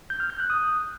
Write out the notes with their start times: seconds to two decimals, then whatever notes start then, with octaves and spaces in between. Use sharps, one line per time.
0.10 G6
0.20 F6
0.30 G6
0.40 F#6
0.50 D#6